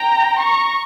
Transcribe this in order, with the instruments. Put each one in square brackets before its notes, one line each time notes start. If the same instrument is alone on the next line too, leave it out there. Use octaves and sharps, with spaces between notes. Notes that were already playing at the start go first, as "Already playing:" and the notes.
Already playing: [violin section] G5 A#5
A#5 C#6